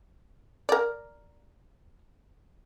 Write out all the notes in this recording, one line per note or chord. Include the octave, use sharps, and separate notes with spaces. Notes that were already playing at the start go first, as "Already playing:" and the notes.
A#4 D5